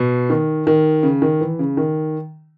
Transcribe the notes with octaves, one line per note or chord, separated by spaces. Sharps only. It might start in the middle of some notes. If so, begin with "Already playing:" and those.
Already playing: B2
D#3
D#3
C#3
D#3
E3
C#3
D#3